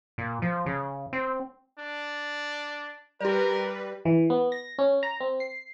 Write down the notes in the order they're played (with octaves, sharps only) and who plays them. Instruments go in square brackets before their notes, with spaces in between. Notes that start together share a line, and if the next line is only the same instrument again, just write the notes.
[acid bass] A#2
F3
C#3
C4
[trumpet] D4
[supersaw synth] G3 B4 [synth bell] G4 D5 [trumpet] A#4
[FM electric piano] E3
B3
A#6
C#4
A#5
C4
C7